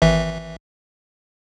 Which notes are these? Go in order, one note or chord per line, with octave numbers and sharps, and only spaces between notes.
G#1 E3 E5